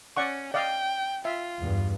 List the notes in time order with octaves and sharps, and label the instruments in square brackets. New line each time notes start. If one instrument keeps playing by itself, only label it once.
[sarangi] C#4 [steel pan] D5 F#5 C#6
[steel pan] D5 D#5 F5 [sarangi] G5
[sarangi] F4 [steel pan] E5
[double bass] E2 G2